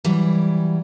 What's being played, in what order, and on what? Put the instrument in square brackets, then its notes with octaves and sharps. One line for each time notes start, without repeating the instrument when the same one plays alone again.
[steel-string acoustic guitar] E3 F#3 G3